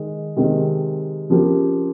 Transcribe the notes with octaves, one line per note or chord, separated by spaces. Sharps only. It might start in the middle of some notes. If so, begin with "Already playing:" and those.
Already playing: D#3 G#3
C3 D#3 G#3 C4
C#3 F3 C4 G4 A#4